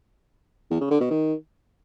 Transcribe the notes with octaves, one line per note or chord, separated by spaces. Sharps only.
E2
C#3
D3
B2
D#3